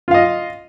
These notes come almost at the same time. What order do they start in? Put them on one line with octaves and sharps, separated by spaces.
F4 F5 D#5